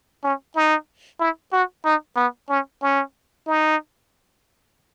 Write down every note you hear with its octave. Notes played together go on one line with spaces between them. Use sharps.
C#4
D#4
E4
F#4
D#4
B3
C#4
C#4
D#4